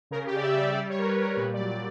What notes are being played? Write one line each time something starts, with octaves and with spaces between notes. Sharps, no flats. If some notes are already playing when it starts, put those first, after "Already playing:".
C#3 A#4
G4
C#3 D5
E5
G3 D5
G3 D5
C#5
G3 A#4
B4
G3 A#4
A#2 B4
D5
F#3
D5